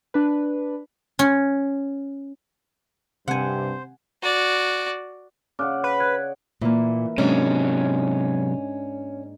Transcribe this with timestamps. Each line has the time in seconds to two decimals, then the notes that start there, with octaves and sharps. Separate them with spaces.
0.14 D4 B4
1.19 C#4
3.28 G2 C3 C5 F#5 G#5
4.22 F#4 D5
5.59 C#3 D5 F#5 D6 F6 F#6
5.84 B4
6.00 F#6 G#6
6.62 A#2 E3 A#3
7.18 G#2 C3 F#3 C#4 D4